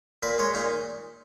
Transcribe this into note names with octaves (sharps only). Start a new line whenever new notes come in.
A#2 B4
G#3 C#5
A#2 D#4